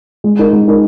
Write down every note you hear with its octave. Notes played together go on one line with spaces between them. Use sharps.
G#3
D#4 A#4
G#3
D#4 A#4